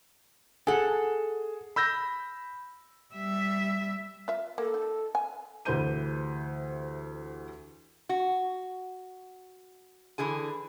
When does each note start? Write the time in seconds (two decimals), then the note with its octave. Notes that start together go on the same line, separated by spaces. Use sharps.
0.67 G#4 A4 F#5
1.76 B5 E6 G6 A#6
3.14 G3 E5
4.28 F4 E5
4.58 A#3 A4
4.74 D#4
5.15 G#5
5.65 D2 E3 G4 C5 G6 D#7
8.09 F#4
10.18 D3 E3 G#4 G#5